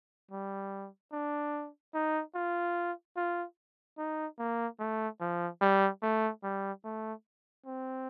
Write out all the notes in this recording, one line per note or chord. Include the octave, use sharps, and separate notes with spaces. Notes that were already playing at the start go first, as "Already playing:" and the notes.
G3
D4
D#4
F4
F4
D#4
A#3
A3
F3
G3
A3
G3
A3
C4